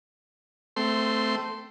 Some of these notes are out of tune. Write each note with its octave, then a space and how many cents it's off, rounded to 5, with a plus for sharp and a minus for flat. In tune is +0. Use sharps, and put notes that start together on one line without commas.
A3 +5 C4 -15 C6 +0